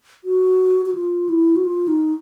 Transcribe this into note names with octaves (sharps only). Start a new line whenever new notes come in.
F#4
F#4
F4
E4
F#4
F4
D#4